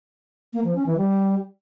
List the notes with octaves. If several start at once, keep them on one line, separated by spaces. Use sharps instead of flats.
A#3
F3
C#4
E3
G3